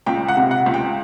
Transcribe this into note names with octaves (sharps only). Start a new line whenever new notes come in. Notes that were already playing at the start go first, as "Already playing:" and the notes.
C#2 G5
F#5
C3
F#5
C#2
G5